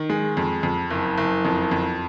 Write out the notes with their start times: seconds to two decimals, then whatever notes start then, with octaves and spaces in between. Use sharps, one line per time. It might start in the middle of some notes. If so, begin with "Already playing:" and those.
Already playing: D#3
0.10 G#3
0.37 F2
0.63 F2
0.90 F#1
1.18 F#1
1.45 F2
1.71 F2